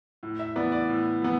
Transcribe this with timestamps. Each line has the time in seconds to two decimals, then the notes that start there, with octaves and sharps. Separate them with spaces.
0.23 A2
0.39 E5
0.56 E3 B3 D5
0.72 D5
0.89 A2
1.22 E3 B3